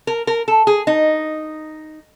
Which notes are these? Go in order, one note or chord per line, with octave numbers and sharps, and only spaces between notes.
A#4
A#4
A4
G#4
D#4